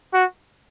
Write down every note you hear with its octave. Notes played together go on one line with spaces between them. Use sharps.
F#4